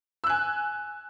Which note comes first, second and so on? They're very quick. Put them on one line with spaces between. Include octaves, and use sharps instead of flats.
E6 F#6 G#5